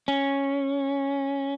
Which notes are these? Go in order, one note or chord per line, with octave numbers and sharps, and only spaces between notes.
C#4